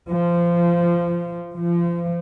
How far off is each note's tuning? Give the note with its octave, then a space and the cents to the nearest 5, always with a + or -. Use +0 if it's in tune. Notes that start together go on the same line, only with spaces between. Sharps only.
F3 -20
F3 -30